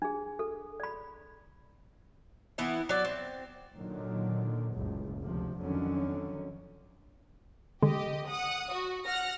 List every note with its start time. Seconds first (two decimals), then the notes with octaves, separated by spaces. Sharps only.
0.02 D4 G#4
0.39 A4
0.80 D5 B5
2.58 E3 B3 E4
2.89 F#3 D5
3.05 C4
3.77 A#2 D3 D#3 F#3
4.73 F#1 C#2 A2
5.21 D2 C3 F3
5.59 F2 D3 D#3 F#3 C#4
7.83 D3 G#3 G4 D#5
8.28 F#5 D#6
8.73 F#4
9.05 F#5 F6 A#6